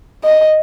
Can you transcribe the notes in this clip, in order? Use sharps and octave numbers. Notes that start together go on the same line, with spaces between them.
D#5